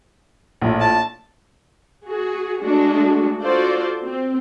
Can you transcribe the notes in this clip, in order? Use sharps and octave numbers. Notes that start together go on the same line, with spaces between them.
A#1 A2
A5
F#4 G#4
G#3 A3 D4 F#4
F4 F#4 A4 C5 D5
C4